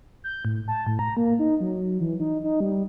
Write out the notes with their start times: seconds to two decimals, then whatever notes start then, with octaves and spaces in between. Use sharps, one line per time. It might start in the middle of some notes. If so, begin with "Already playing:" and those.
0.24 G6
0.45 A2
0.68 A5
0.87 A2
0.99 A#5
1.17 A#3
1.39 D#4
1.60 F#3
2.01 E3
2.20 D#4
2.44 D#4
2.60 G3